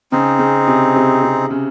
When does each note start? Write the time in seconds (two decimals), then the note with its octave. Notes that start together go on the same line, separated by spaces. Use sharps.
0.12 C#3 C4 D#4 G#4
0.39 C#3
0.68 C3
0.96 C3
1.23 C3
1.50 C#3